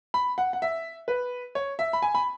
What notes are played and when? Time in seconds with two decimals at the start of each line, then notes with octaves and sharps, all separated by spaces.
0.14 B5
0.38 F#5
0.53 F#5
0.62 E5
1.08 B4
1.55 C#5
1.79 E5
1.93 B5
2.02 G#5
2.15 B5